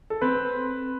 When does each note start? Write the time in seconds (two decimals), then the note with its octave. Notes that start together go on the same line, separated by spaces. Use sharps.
0.10 A4
0.21 C4 B4